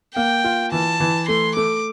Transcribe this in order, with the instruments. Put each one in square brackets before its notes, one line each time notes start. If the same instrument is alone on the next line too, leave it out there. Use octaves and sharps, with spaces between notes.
[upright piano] A#3 [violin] G5
[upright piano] F4
[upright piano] E3 [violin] A5
[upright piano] E3
[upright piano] A3 [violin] C6
[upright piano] A3 [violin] D6